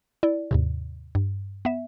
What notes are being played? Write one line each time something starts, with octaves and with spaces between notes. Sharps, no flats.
E4 D5
D#2 G#2 C3
G2
B3 E5